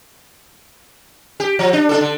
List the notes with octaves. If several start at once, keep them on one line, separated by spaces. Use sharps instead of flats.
G4
F3
D4
D4 F4 A4
D3